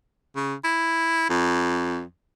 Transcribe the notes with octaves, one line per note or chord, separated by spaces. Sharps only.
C#3
E4
F2